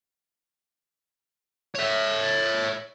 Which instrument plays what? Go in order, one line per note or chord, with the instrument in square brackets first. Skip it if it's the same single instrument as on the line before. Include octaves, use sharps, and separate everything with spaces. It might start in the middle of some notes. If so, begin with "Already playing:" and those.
[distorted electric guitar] C#5 E5